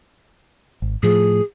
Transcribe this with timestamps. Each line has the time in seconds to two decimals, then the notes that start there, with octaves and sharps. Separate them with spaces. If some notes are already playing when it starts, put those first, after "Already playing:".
0.82 G#1
1.03 A2 F3 G#4